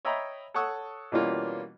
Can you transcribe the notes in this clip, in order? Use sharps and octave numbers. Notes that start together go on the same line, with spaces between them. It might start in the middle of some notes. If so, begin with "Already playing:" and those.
C#5 D#5 E5 G5 A#5 B5
A4 C#5 F#5 C#6 D#6 E6
B2 E3 G3 A#3 C#4 F4